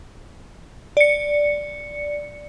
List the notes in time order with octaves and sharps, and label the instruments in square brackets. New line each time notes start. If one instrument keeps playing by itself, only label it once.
[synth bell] D5 C#7